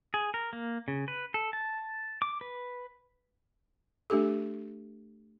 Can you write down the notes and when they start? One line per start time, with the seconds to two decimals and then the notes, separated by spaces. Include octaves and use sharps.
0.14 G#4
0.34 A#4
0.53 A#3
0.88 C#3
1.08 B4
1.34 A4
1.53 A5
2.22 D6
2.41 B4
4.10 A3 D4 G4 A4